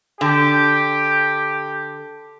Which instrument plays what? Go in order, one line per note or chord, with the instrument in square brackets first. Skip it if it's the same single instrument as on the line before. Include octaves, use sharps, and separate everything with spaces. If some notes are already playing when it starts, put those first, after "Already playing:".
[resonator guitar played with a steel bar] D3 [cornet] G4